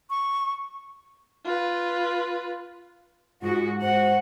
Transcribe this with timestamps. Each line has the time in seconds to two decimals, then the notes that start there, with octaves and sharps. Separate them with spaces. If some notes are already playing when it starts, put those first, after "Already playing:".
0.10 C#6
1.44 F4 B4
3.42 G#2 F4 F#4
3.81 G#2 F#4 C5 F#5